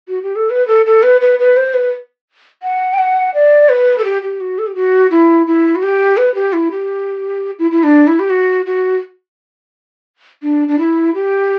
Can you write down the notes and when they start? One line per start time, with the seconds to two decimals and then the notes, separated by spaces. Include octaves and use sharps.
0.08 F#4
0.23 G4
0.36 A4
0.50 B4
0.68 A4
0.86 A4
1.03 B4
1.21 B4
1.39 B4
1.57 C5
1.74 B4
2.63 F#5
2.93 G5
2.98 F#5
3.34 D5
3.69 B4
3.98 A4
4.04 G4
4.22 G4
4.41 F#4
4.59 A4
4.67 G4
4.75 F#4
5.11 E4
5.47 E4
5.76 F#4
5.83 G4
6.17 B4
6.35 G4
6.53 E4
6.71 G4
7.59 E4
7.71 E4
7.83 D4
8.07 E4
8.19 G4
8.30 F#4
8.66 F#4
10.43 D4
10.68 D4
10.79 E4
11.15 G4